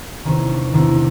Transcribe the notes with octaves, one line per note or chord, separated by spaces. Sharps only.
E2 C3 D#3 C#4
D4
E2 C3 D#3 D4